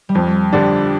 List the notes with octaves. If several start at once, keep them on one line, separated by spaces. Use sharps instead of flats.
G3
F2 F3
D3 G3 D4